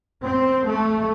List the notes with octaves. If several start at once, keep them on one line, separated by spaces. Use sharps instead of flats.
C4
A3